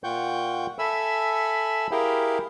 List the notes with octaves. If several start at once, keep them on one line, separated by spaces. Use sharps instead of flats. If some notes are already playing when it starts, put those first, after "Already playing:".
A#2 F4 F#5 G5 C#6 G6
A4 E5 G#5 B5 E6
E4 G4 G#4 A#4 F5 G5